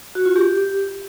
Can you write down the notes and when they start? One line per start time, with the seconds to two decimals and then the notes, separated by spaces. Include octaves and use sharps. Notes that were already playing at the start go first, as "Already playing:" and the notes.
0.15 F#4
0.25 F4
0.36 G4